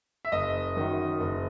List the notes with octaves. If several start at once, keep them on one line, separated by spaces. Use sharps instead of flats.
E5
F#1 D#5
F#2 D#3 F#3
F#1